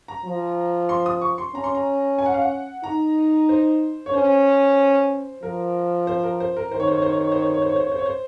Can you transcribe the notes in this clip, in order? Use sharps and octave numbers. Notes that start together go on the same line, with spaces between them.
A#5
F3
C6
D#6
C#6
C6
C#4 A#5
C6
A#5
G#5
F#5
F5
F#5
D#4 A#5
C5
C#5
C#4 C5
F3 A#4
C5
A#4
C5
A#4
D#3 C5
C#5
C5
C#5
C5
C#5
C5
C#5
C5
C#5
C5
C#5
C5
C#5
C5
C#5
C5
C#5
C5